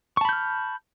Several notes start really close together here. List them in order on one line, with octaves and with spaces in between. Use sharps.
C#6 A5 B5 G6 F6